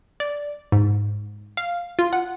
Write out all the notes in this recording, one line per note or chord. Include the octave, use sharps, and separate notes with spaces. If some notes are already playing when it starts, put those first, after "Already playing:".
D5
G#2
F5
F4
F#5